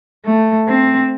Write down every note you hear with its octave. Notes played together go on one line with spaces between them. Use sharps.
A3
C4